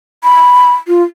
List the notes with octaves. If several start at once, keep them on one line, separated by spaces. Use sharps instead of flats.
B5
F4